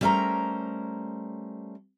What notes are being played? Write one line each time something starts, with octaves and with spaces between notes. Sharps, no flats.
G3 A3 C#4 A#4 C5 A#5